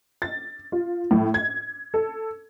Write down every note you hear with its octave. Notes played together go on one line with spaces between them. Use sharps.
A6
F4
A2
G#6
A4